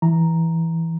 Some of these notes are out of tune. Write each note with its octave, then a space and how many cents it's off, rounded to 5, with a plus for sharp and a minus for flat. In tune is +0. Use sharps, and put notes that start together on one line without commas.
E3 +0 A#5 +0